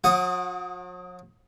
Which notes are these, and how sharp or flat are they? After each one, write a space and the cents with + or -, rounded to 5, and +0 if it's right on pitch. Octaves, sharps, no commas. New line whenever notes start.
F#3 -45 F#5 -15 D#6 +0